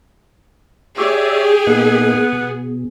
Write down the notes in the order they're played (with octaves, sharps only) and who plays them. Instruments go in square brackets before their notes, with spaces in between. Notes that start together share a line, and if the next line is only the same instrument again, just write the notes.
[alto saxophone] G4 [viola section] G#4 [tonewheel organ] C#5 D5 E5
[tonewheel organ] A#2 A#3 D#4 [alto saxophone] B3
[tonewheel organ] B2